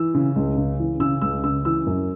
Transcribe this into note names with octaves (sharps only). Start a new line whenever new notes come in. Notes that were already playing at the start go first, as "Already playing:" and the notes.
Already playing: E3 E6
C#3
C#2
C#3
E3
C#3 E6
C#2 E6
C#3 E6
E3 E6
F#2